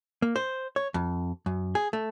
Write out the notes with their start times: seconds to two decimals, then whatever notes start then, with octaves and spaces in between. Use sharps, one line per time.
0.22 A#3
0.36 C5
0.76 C#5
0.94 F2
1.46 F#2
1.75 G#4
1.93 A3